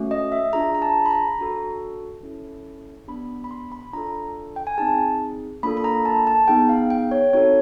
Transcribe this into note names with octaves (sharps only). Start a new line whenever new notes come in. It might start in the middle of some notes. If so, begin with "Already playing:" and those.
Already playing: A3 C#4 F#4
D#5
E5
D4 F4 G#4 A#5
A#5
A5
B5
A#5
D4 F#4 A4
C#4 E4 A4
B3 D4 G4 B5
B5
C6
B5
D4 F4 A4 A#5
G5
G#5
C4 D#4 G#4 A5
A#3 D4 F4 A4 B5
B5
A#5
A5
A5
B3 D#4 G#4 G5
F5
G5
C#5
C4 D#4 F#4 A4 C#5